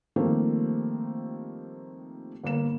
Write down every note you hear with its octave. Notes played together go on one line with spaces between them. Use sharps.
D#3 F3 G3 A3 A#3 C4
G1 A#3 E7